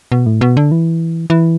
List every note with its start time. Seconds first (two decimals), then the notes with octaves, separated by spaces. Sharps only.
0.12 B2
0.26 A2
0.41 B2
0.57 D3
0.72 E3
1.30 E3